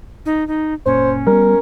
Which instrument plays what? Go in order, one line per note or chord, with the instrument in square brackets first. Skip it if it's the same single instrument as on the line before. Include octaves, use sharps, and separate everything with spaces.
[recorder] D#4
D#4
[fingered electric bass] F#1 A#2 [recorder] C#4 [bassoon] C5
[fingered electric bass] G3 B3 [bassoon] A#4